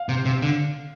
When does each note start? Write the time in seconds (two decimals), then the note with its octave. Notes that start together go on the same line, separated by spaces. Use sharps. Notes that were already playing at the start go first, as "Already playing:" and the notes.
Already playing: F5
0.09 C3
0.25 C3
0.42 D3